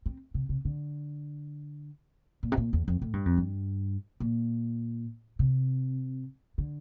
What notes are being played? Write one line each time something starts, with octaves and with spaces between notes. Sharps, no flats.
C4
C3
C3
D3
A#2
C3
A#2
E2
F2
A2
G2
F2
G2
A#2
C3
D3